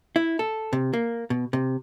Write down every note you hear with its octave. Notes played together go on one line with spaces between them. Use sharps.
E4
A4
C3
A#3
B2
C3